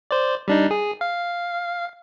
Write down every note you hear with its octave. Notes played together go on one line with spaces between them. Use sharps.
C5 D5
G3 D4 D#4
G#4
F5